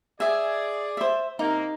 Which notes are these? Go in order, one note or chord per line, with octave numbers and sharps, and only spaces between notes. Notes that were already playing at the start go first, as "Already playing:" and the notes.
G#4 D5 E5 G#5
C5 E5
C3 A#3 D#4